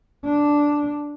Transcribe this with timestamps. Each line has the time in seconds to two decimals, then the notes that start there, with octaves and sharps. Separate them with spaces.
0.25 D4